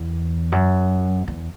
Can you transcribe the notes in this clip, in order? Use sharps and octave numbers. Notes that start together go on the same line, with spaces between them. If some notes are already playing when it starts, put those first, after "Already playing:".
Already playing: E2
F#2
E2